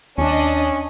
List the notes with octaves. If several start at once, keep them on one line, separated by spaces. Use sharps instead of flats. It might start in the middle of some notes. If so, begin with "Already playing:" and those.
D#2 C#4 D4 D#5